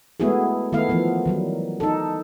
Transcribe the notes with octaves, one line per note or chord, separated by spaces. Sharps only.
G#3 A3 B3 E4 F#4 G#4
D#3 A3 B3 E4 F5
E3 F3 B3
D#3 F#3 G3
D#4 A4